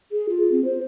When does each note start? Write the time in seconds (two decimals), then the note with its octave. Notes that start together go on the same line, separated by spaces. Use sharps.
0.12 G#4
0.29 F4
0.52 C4
0.65 C5